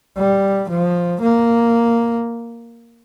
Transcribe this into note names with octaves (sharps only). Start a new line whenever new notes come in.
G3
F3
A#3